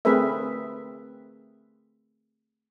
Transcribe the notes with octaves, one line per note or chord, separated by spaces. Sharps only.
A3 C4 G#4 A#4 B4 E5